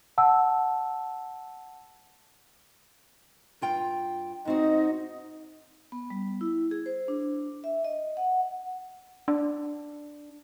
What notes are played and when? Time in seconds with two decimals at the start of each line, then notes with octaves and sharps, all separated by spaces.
0.18 F#5 A5 E6
3.61 G2 F4 G5
4.45 G#2 C4 D#4 F#4 D#5
5.92 B3
6.10 G3
6.41 E4
6.71 G#4
6.86 C5
7.08 D4
7.64 E5
7.84 D#5
8.17 F#5
9.28 D4